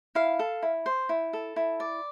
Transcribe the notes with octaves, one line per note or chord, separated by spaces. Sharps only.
E4 F5
A4
E4
C5
E4
A4
E4
D5